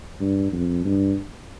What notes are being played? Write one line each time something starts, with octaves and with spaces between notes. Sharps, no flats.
G2
F2
G2